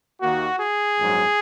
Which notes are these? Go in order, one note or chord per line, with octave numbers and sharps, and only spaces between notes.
D#2 D#3 A#3 F#4
G#4
A#1 G#2 F#3